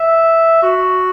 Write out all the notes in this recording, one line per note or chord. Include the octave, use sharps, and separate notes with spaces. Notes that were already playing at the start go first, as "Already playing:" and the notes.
Already playing: E5
F#4